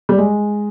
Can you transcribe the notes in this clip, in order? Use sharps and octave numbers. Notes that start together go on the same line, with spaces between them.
G3
G#3